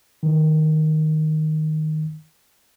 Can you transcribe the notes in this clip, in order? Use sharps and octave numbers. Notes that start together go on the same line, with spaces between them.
D#3 E3